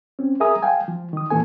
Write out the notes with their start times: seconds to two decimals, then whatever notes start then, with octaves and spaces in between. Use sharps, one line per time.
0.19 C4 C#4
0.40 G#4 A#4 E5 G#5 A#5 D#6
0.62 F5 G5 G#5
0.88 F3
1.13 D#3 D#6
1.31 A#2 D#3 E3 B3 A4 G#5